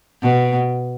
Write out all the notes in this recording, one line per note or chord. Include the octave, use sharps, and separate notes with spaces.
B2